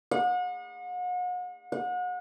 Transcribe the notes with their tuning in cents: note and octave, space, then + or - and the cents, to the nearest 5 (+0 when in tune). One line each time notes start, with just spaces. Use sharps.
F#5 -40
F#5 -35